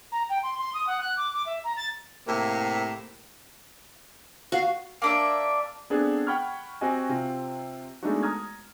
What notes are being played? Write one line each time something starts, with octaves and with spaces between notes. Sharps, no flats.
A#5
G5
C6
C6
D#6
F#5
F#6
D6
D6
E5
A#5
A6
A2 C3 A#3
F#4 F5
A#3 D4 E5
B3 C4 D4 G#4 A4
F#5 G5 B5 C#6 F6 G#6
C4 F#4 G4 D#5 G#5
C3 C4 F4
G#3 A3 B3 D4 D#4 F#4
A#5 D#6 F6 G#6